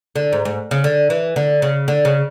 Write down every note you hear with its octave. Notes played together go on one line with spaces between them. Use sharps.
D3
G#2
G#2
C#3
D3
E3
D3
C#3
D3
C#3